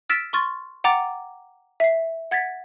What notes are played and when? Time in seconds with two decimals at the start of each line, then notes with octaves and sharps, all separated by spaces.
0.09 E6 F6 A6 B6 D7 E7
0.33 C6 C#6 F6 A6
0.84 F#5 G5 A#5 D6 A6
1.80 E5 C7
2.31 F#5 G#6 A6 B6